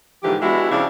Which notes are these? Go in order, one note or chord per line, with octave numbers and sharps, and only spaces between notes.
G#2 D3 E3 F3 G4
G#3 B3 D4 E4 F#4 G4
C#3 F3 C4 D4 E4 F5